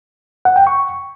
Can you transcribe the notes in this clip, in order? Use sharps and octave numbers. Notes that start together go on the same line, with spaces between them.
F#5
G5
C#6